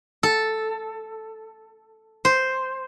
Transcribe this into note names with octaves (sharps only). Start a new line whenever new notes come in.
A4
C5